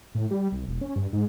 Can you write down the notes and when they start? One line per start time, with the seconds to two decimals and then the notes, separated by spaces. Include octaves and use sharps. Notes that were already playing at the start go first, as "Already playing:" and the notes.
0.15 A2
0.31 G3
0.52 C2
0.68 E1
0.81 C#4
0.96 G2
1.13 G#2